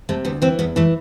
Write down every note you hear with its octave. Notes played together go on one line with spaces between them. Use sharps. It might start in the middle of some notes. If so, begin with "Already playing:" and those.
C3 A3
D2 B3
E3 C4
E2 B3
E3 A3